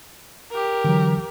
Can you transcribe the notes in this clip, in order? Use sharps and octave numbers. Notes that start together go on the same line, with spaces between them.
G4 A#4
D3 E3 F#3